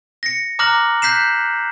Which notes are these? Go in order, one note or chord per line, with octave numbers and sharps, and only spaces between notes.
A#6 C#7
A#5 D6 F6 F#6 A#6 F#7
F#6 G6 B6 C7 E7